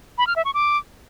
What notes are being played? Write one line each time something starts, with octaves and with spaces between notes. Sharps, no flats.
B5
F6
E5
C#6
D6